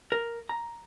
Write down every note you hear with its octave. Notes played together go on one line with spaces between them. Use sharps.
A#4
A#5